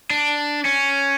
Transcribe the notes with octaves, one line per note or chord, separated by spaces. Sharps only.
D4
C#4